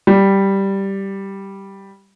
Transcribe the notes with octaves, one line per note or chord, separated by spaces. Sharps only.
G3